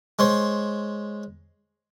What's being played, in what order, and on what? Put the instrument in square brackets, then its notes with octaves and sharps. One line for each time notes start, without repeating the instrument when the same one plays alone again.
[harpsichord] G#3 C5 C#5